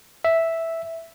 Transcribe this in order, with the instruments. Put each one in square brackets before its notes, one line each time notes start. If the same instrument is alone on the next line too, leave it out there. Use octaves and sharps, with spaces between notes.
[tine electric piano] E5